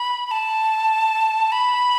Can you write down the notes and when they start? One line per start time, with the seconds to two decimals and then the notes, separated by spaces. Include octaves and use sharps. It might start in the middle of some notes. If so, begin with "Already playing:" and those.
Already playing: B5
0.26 B5
0.31 A5
1.52 B5